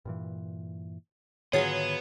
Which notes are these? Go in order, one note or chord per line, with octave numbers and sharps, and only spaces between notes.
G2 A#2 E3
G#2 D3 D#3 F#3 B3 F4 G#4 C#5